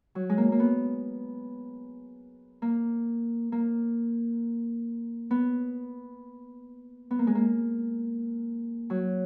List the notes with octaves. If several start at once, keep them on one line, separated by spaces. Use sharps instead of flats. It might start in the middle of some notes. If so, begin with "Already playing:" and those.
F#3
G#3
A#3
A#3
B3
A#3
A#3
B3
B3
A#3
G#3
A#3
F#3